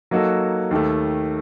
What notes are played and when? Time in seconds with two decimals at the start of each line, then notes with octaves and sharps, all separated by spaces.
0.11 F#3 A#3 D#4 F#4 A4
0.71 D#2 D#3 A3